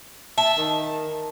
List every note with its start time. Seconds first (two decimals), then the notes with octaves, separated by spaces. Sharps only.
0.38 E5 A5
0.58 D#3